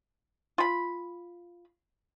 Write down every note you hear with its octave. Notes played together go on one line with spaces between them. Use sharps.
F4 B5